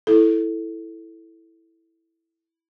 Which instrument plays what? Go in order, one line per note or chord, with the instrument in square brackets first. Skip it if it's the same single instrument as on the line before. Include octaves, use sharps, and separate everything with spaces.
[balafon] E4 A4